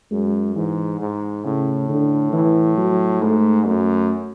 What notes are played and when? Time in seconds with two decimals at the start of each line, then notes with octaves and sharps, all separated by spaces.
0.11 F#2 G#3
0.55 G#2 E3
1.00 G#2
1.44 A2 C#3
1.89 D3
2.33 E3
2.78 F#3
3.21 G#2 A3
3.66 F#2 A3